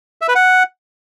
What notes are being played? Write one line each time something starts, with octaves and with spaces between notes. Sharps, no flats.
E5
B4
F#5